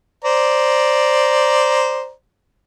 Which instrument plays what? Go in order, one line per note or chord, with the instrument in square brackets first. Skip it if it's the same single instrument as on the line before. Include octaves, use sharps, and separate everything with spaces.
[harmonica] C5 D5 A#5